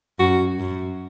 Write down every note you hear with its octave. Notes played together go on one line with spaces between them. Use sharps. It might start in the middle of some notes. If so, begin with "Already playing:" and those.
F#2 F#4
F#2